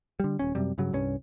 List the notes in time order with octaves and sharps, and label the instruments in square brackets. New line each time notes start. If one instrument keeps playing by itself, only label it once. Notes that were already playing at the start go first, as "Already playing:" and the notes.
[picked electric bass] D3 G3
D#1 C#4
F#2 C3 G3
G2 C#3 F#3
C2 G2 C#4